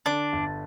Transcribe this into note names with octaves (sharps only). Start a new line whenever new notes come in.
D3 D4
G1